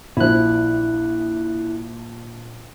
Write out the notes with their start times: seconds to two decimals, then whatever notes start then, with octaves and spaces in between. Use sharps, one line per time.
0.17 A#1 F3 E4 F#6